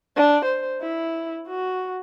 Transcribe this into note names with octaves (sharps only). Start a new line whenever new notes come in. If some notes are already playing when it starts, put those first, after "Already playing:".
D4
C5
E4
F#4